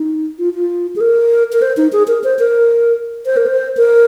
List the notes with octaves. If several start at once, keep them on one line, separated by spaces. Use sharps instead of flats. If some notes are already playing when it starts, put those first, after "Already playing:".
Already playing: D#4
F4
F4
G#4
A#4
A#4
C5
D#4
G#4
A#4
C5
A#4
C5
A#4
C5
A#4